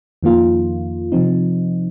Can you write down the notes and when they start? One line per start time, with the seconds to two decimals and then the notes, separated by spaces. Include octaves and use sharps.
0.23 F2 D#3 A#3 F4
1.12 C3 F3 C4 D#4